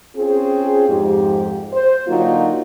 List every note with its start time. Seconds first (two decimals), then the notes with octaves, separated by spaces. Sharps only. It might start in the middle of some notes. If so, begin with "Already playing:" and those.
0.16 C4 C#4 F4 G#4
0.89 F2 G#2 G4
1.73 C5
2.07 D3 F#3 A#3 D#4 F4